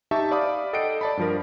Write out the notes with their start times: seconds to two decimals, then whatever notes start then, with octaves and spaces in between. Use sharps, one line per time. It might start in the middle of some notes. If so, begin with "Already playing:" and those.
0.11 D#4 G4 E5 A5 C#6
0.31 D5 F5 B5 D6 D#6
0.73 A4 D#5 F#5 G5 C7 D7
1.01 D5 A5 B5
1.17 G2 F3 A#4